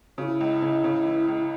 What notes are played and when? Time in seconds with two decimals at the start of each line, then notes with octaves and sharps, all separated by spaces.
0.18 C#3 E4 F#4
0.41 C#2
0.62 C#3
0.84 C#3
1.06 E3
1.28 C#2